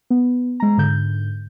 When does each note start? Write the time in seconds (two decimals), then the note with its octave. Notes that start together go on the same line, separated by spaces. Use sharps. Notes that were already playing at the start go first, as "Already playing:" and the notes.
0.10 B3
0.60 G#3 A#5
0.77 G#2 D3 G6